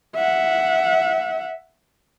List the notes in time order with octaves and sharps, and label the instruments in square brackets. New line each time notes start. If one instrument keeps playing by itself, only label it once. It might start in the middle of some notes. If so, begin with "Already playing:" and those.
[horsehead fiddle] E5 F#5